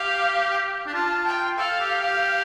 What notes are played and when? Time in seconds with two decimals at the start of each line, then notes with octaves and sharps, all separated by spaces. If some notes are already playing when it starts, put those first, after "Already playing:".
Already playing: G4 F5
0.86 D4
0.94 F4 A5
1.26 G5
1.58 A4 F5
1.80 G4
2.01 G4